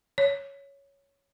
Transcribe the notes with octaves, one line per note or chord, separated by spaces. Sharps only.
C#5